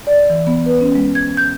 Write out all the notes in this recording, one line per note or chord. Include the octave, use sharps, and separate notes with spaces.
D5
E3
B3
B4
C#4
G#3
G#6
G6